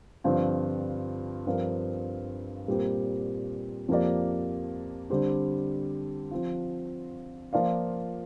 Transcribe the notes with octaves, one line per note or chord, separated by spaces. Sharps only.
G2 D3 F3 C4 F4
G2 F3 C4 A#4 F5
A#2 G3 C4 G4 A#4
F2 F3 A#3 G4 D5
D3 G3 C4 G4 C5
F3 C4 F4
F3 A#3 F4 D5 F5